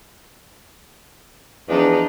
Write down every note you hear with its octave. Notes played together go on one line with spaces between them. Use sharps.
E2 F3 D4 D#4